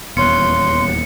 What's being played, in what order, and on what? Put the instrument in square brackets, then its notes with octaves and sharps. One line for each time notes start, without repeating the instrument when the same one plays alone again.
[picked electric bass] D#1 E2 [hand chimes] B3 C#5 F#6 [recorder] C6 [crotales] C#7